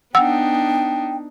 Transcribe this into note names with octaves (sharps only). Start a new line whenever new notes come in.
B3 D4 D#4 F#5 G5 E6